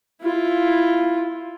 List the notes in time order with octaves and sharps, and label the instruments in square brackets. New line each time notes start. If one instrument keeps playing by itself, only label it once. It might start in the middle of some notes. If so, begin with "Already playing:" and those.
[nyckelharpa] E4 F4